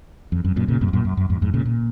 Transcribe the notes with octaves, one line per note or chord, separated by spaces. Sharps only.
F2
F#2
F#2 A#2
A#2 C#3
F#2 A#2
G#2
F#2 A#2
F#2
F#2
F2 G#2
F2 G#2
A#2 C#3
A#2